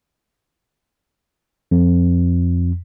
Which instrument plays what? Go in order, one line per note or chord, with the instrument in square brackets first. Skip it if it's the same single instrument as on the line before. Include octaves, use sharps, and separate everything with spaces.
[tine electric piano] F2